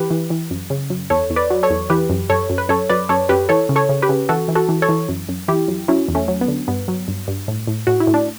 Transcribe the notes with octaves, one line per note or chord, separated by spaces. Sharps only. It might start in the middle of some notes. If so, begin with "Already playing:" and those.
Already playing: E3 G4 B4
E3
E3
F#2
C#3
F#2
E2 A4 C#5
E2
B4 D5
F#3
A4 C#5
E2
E3 G4 B4
F#2
F#2 A4 C#5
F#2
B4
F#2 A4 C#5
F#2 B4 D5
F#2 A4 C#5
F#2 G4 B4
E3 A4 C#5
C#3
A4 C#5
C#3
G4 B4
C#3
E3 F#4 A4
E3
F#4 A4
E3
A4 C#5
E3
F#2
F#2
E3 E4 G4
F#2
F#3 C#4 E4
E2
A3 C#4
F#3
B3
D3
G2 B3
F#3
G2
G2
A2
A2
A2 F#4
E4
A2
D4